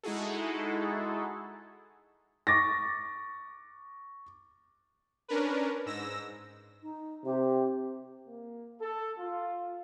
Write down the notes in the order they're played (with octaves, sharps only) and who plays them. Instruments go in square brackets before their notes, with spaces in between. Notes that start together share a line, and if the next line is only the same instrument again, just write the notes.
[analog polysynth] G#3 D#4 E4 F#4 G#4 A4
[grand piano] C#6 D6 A6 A#6
[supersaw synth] C#4 D4 A#4 B4
G#2 E6 A#6
[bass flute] D#4
[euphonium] C3 [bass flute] G4
[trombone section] A#3
A4
F4